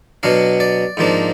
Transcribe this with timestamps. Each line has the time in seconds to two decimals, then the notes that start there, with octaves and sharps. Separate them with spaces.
0.23 B2 F#3 D4 F5
0.60 D5
0.97 G#2 F3 A#3 D4